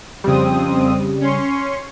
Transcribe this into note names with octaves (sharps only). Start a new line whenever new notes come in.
F2 C#3 G3 C4 D#6
C#4 C6 C#6